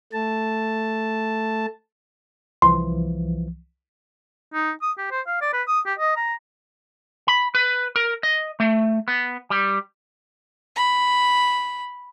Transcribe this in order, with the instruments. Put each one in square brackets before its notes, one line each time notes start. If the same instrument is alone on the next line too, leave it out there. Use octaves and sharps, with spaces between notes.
[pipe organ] A3 A5
[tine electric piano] C2 E3 F3 [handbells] C6
[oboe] D#4
D#6
G4
C5
F5
D5
B4
D#6
G4
D#5
A#5
[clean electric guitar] B5
B4
A#4
D#5
A3
B3
G3
[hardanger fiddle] B5